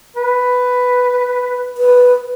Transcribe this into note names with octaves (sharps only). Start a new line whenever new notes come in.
B4
B4